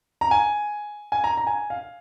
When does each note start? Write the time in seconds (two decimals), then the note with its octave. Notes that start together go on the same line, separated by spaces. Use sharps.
0.21 A#5
0.31 G#5
1.12 G#5
1.24 A#5
1.37 A#5
1.47 G#5
1.70 F5